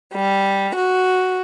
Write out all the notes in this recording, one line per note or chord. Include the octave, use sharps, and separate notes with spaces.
G3
F#4